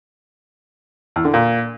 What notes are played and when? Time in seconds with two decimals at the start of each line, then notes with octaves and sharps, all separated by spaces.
1.16 E2
1.25 D3
1.34 A#2